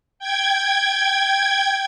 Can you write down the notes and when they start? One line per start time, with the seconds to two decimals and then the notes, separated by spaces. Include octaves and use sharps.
0.19 G5 G#6